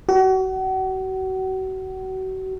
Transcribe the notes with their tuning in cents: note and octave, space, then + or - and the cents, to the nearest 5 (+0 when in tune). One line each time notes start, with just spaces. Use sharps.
F#4 +35